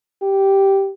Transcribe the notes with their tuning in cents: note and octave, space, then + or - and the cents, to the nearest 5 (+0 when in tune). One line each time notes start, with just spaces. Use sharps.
G4 -5